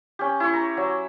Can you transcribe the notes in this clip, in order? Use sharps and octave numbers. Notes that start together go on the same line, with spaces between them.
C#4 G4
E4 C#5
A#5
F#3